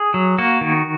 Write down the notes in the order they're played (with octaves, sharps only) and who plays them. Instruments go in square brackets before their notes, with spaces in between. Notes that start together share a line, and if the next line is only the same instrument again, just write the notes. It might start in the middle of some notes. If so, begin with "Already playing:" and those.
Already playing: [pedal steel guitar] G#4
F#3
A#3 F#4
D#3